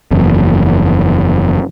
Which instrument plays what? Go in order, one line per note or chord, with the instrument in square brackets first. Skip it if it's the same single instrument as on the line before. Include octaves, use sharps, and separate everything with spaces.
[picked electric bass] F#1 E2